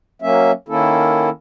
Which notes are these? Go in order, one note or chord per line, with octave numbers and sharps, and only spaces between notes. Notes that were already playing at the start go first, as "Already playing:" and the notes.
F#3 A#3 C#4 E5
D#3 A#3 C#4 E4 A4